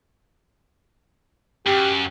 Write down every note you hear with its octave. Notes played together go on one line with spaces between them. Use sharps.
F#2 G4